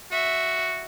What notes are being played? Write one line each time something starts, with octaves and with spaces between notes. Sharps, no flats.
F#4 E5